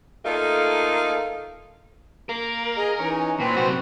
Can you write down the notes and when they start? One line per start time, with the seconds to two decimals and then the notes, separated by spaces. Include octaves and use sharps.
0.25 A3 A#3 D#4 F4 A4 A#4
2.29 A#3 A#4
2.77 G#4 D#5
2.99 E3 C#4 D#4
3.40 A#2 C4 B4
3.56 F#2 C3 F#4